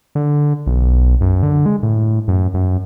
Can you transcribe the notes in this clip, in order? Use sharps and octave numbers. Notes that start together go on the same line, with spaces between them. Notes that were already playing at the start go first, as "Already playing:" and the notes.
D3
B1
F#2
D3
G#3
A2
F#2
F#2